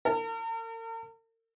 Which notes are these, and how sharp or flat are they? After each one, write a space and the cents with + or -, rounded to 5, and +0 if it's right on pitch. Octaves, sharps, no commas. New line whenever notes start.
A#4 -45